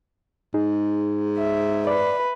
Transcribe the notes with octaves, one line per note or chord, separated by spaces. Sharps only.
G#2 D#4 G#4
E5
B4 D5